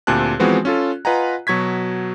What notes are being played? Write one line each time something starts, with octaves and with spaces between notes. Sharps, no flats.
D2 A#2 C4 G4 A5 F#6
E3 F3 G#3 B3 C4 F#4
C#4 F4 A4
F4 B4 D#5 F#5 G#5 A#5
B2 F#3 C#6 G#6 B6